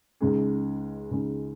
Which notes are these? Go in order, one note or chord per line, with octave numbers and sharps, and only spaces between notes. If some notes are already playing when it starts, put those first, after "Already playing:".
C#2 C#3 G#3 D#4 G#4
C#2 C#3 G#3 D#4 G#4